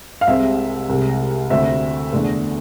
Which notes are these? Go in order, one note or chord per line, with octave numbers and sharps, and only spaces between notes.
F5
C2 C3 G#3 C4 E5
C2 C3 G#3
D2 D3 A3 C4 E5
E2 D3 A3